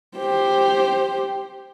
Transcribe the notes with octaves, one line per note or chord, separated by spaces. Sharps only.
G4 C5